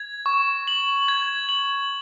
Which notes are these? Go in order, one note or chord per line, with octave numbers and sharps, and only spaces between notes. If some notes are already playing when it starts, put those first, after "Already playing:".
Already playing: G#6
C#6
F#7
G#6
F#7